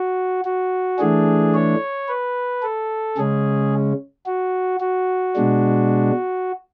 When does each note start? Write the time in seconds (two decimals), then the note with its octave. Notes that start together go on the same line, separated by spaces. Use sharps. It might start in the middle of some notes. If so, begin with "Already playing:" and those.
Already playing: F#4
0.45 F#4
0.98 E3 A3 D4 G#4
1.54 C#5
2.08 B4
2.63 A4
3.17 C#3 G#3 C#4 G#4
4.26 F#4
4.80 F#4
5.35 B2 G#3 D4